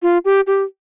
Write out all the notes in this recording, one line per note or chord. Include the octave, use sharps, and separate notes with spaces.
F4
G4
G4